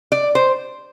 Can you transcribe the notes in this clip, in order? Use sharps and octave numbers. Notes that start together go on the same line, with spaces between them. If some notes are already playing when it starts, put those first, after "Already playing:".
D5
C5